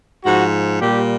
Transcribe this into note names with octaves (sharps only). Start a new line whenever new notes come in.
G#2 F3 F#4
A#2 G3 G4